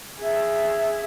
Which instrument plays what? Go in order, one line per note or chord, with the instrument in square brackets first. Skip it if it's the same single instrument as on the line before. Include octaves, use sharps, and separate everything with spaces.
[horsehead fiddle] G#4 E5